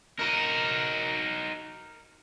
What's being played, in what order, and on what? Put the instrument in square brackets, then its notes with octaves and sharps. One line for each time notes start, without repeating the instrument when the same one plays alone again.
[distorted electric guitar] D#4 F#4 [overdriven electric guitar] A#4